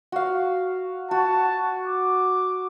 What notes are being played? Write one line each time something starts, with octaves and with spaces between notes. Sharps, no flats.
F#4 F5
F#4 A5
D6